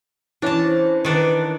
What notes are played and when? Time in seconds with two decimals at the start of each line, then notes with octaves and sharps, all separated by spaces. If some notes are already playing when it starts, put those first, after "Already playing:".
0.42 E3 C#4 D4 A5
0.64 C5
1.05 D#3 D4 B4